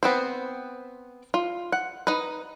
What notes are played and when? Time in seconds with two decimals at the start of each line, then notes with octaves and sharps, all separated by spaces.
0.03 B3 C4 C5
1.34 F4
1.72 F#5
2.07 D#4 B4